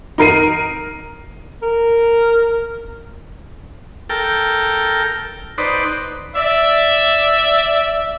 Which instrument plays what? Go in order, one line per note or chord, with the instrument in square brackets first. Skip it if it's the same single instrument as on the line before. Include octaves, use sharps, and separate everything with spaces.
[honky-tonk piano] D#4 A#4 C7 D#7
[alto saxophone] A#4
[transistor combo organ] A4 A#4 G5
D#4 B4 C5 D5
[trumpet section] D5 E5